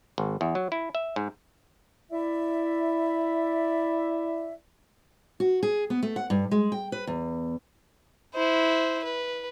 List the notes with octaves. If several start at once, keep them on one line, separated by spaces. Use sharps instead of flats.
G#1
E2
F#3
E4
E5
G#2
E4 D5 E5
F#4
G#4
B3
A3
F#5
G2
G#3
G5
B4
E2
E4 C5
B4